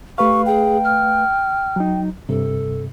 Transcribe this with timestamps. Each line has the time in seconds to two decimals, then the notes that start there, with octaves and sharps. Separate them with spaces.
0.18 A3 G4 B4 F5 C#6
0.46 G#4 G5
0.84 F6
1.76 F#3 D#4
2.29 G2 C3 A4